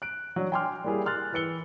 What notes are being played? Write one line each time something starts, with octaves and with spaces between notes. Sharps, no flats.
F#6 D7
F#3 D4
G5 G#5 C6 D6 F6
G3 A#3 E4 G4 G#4
C6 F6 F#6 A6
E3 B4 E6 C#7 G7